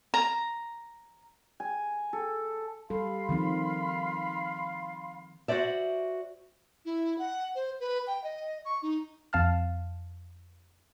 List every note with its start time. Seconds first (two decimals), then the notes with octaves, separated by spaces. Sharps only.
0.14 A#5
1.60 G#5
2.13 A4
2.90 G3 A4 F5 B5 C6
3.29 D#3 F3 C4
5.48 F#4 G4 C5 D5 E5
6.85 E4
7.19 F#5
7.55 C5
7.80 B4
8.07 G5
8.24 D#5
8.65 C#6
8.82 D#4
9.33 F2 F5 A5 F6